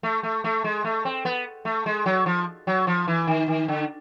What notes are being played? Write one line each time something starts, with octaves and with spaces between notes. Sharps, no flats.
A3
A3
A3
G#3
A3
C4
B3
A3
G#3
F#3
F3
F#3
F3
E3
D#3
D#3
D3